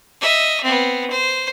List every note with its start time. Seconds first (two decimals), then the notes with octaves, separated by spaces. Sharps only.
0.21 D#5 E5
0.63 B3 C4
1.10 C5